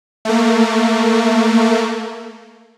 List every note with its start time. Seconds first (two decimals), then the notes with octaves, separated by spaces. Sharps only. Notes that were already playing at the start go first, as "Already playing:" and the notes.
0.25 A3 A#3